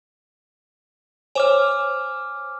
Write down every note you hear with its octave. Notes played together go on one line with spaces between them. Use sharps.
C5 C#5 G#5 D6 F6